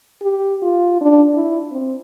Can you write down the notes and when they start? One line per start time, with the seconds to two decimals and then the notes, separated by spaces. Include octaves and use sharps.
0.22 G4
0.62 F4
1.01 D4
1.35 E4
1.71 C4